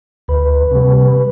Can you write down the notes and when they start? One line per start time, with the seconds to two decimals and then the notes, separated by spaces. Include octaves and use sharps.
0.28 D2 B4
0.72 C3 G3